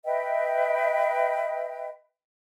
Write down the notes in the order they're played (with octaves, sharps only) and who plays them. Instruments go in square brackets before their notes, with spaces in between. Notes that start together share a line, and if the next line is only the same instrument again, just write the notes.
[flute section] B4 D#5 E5 G5